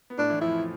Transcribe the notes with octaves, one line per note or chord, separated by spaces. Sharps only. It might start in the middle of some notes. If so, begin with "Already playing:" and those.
B3
A2 A3 D4
E3
F2 F3 E4